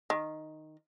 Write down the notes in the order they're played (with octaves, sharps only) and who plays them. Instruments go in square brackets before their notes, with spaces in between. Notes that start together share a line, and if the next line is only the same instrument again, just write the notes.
[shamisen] D#3